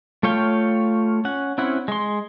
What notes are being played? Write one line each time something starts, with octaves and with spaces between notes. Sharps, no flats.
A3 F4 C#5 F5 G5
C#4 F#5
C4 C#4 E4 F#5
G#3 C6